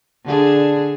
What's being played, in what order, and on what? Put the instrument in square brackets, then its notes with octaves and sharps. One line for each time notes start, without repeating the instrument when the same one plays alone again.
[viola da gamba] D3 D4 G#4